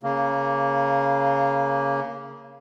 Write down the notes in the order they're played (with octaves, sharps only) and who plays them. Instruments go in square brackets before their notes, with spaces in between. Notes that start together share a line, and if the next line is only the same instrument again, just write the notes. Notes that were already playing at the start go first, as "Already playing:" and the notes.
[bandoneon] C#3 A#3